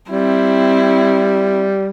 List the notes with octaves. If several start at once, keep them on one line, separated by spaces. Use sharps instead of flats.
G3 C4 E4